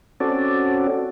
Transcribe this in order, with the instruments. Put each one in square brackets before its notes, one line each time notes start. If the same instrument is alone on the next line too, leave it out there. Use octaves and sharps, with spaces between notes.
[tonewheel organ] C4 C#4 F#4 A4 D5